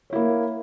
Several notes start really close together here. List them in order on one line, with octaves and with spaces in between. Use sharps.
C#5 E4 A#3